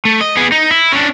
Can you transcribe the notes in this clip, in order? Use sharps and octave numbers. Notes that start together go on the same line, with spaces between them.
A3
D#5
B3 G#4
D#4
E4
C#4 D4